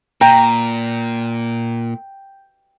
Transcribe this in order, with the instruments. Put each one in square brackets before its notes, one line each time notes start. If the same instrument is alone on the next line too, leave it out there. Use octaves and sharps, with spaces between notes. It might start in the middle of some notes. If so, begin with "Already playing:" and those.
[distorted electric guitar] A#2 [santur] G5 [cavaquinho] A#5